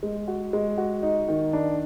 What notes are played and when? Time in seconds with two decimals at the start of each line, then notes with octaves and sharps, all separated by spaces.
0.03 G#3
0.28 F#4
0.53 G#3
0.78 F#4
1.03 D#4
1.28 D#3
1.53 D4